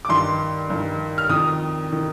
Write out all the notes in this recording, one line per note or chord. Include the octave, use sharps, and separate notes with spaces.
D6
G2 D#3 C6
G2 D#3
F6
F2 D#3 D#6
D#3